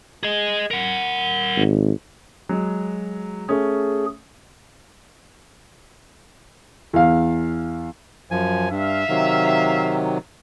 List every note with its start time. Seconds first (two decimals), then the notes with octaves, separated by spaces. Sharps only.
0.23 G#4 D#5
0.71 A#4 F#5
1.57 G#1
2.49 F#3 G#3
3.49 A3 C#4 G#4
6.93 E2 F5
8.31 F#2 F3 G#5
8.71 G2 E5 F5
9.09 C3 D#3 F#3